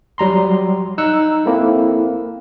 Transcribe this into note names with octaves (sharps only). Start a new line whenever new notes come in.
F#3 G3 A#5 C6
D#4 E6 F#6 C#7
A#3 C4 E4 A4